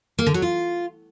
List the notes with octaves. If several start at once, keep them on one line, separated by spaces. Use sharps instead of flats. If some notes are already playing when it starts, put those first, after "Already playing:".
A#3
D3
F#3
F4